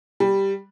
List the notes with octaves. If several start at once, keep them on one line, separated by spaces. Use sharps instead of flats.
G3